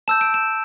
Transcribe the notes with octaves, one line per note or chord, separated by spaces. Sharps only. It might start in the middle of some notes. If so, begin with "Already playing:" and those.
A5 E6 G6 E7
D7
E7